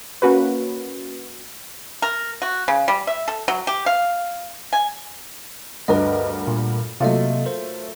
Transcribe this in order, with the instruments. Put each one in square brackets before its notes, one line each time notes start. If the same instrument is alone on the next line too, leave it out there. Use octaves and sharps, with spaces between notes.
[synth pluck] A#3 C#4 F#4 B4
[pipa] A#4
F#4
C#3
G3
E5
A4
F#3
G4
F5
G#5
[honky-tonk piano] D2 G2 A#4 [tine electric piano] B4 D#5
[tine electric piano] A#2
[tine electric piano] C3 A#3 D#5 [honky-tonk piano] F#3 A3 F4
[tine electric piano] A#4 C5